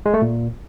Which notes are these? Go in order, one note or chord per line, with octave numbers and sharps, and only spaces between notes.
G#3
A3
A#2